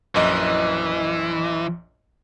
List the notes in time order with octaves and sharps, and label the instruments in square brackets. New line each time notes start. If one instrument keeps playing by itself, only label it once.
[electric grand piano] A#1 F#2 D#5 [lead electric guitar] E3